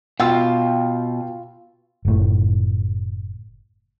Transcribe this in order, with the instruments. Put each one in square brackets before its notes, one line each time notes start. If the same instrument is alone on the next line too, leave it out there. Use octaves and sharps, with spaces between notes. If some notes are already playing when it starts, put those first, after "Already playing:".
[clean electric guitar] B2 [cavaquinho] F4 [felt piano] F5 G5 E6
[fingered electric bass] F#1 A2